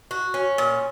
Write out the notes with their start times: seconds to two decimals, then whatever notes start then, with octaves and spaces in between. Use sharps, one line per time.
0.11 F#4
0.34 C#4
0.58 A#2